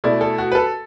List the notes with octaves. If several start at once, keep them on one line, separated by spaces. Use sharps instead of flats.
B2 A3 E4 D5
A4
F#4
B4
A4